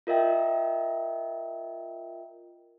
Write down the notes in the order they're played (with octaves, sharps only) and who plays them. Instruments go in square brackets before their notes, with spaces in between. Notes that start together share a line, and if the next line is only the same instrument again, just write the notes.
[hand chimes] F4 A#4 D#5 E5 G5